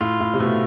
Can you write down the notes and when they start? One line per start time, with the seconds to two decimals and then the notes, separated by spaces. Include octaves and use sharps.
0.01 A2 F4
0.20 A2
0.34 C3
0.40 B2 A3